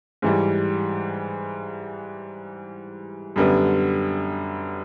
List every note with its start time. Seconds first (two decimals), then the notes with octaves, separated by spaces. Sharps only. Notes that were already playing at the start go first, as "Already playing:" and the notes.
0.22 G#2 E3 G3
3.36 F#2 D3 G3 B3